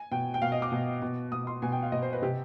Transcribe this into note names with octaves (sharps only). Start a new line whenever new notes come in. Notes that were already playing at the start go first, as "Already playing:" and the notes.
Already playing: G#5
B2 G5
G5
B2 F5
D#5
D6
B2
B2
B2 D#6
C6
B2 G#5
G5
F5
B2 D#5
C5
B4
C3 G4